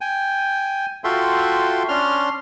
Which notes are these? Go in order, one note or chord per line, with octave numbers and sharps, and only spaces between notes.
G5 G#5
F4 F#4 A4 E5 G5 C6
C#4 D4 C6 F6